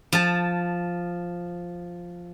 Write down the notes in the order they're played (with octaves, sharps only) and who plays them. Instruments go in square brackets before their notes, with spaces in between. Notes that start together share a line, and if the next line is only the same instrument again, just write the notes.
[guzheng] F3 A5